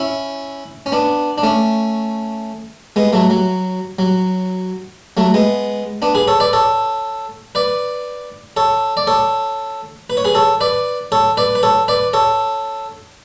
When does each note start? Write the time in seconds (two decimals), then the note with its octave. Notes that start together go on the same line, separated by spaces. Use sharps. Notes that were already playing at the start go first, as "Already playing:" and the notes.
Already playing: C#4 E4
0.86 C#4
0.92 B3 D4
1.38 D4
1.43 A3 C#4
2.96 G#3 B3
3.13 F#3 A3
3.30 F#3
3.99 F#3
5.17 F#3 A3
5.34 G#3 B3
6.02 B3 D4
6.15 G#4 B4
6.28 A4 C#5
6.40 B4 D5
6.53 A4 C#5
7.55 B4 D5
8.57 A4 C#5
8.97 D5
9.07 A4 C#5
10.10 B4
10.17 C#5
10.25 G#4 B4
10.35 A4 C#5
10.61 B4 D5
11.12 A4 C#5
11.37 B4 D5
11.55 B4
11.63 A4 C#5
11.88 B4 D5
12.13 A4 C#5